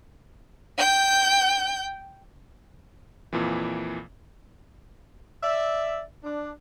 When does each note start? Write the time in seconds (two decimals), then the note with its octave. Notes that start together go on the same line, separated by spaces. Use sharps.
0.78 G5 G6
3.33 F2 A#2 E3
5.43 D5 E5
6.24 D4